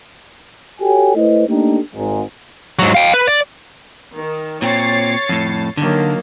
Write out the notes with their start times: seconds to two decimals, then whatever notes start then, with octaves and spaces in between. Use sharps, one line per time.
0.81 F#4 G4 A4 C#5 G5 G#5
1.16 A3 E4 B4 C5 D#5
1.48 A3 A#3 D4 D#4 G4 A4
1.95 G#1 G#2
2.79 G#2 F#3
2.95 F5 G5
3.14 B4
3.27 D5
4.15 D#3
4.62 A#2 C4 C#5 A6 C7
5.29 F2 A2
5.77 D3 D#3 F#3 A#3